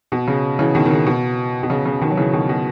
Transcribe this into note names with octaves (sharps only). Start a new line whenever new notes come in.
B2
C#3
C#3 E3
B2 D#3
D#3
C#3
B2
B2
C#3
C#3
B2 D#3
F#3
C#3 E3
B2 D#3
B2